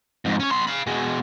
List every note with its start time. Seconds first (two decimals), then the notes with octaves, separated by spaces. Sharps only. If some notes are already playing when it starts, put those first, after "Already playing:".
0.25 F2 G#2
0.40 C#4 C#5
0.51 B3 C6
0.67 F5 B5
0.87 B2 G#3